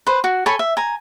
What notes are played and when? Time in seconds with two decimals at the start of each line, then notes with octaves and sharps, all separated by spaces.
0.07 B4 C5
0.24 F#4
0.46 A4 C#5 G#5 B5
0.59 E5
0.77 G#5 A#5